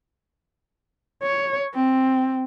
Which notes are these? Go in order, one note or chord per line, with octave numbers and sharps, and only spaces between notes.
C#5
C4